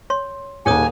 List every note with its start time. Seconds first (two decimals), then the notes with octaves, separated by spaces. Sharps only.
0.10 C#5 C6
0.66 D#1 D#2 G#4 C#5 G#5 D#6